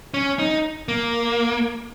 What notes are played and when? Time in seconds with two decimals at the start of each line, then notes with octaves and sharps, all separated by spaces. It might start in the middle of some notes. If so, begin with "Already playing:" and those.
0.14 C#4
0.39 D#4
0.88 A#3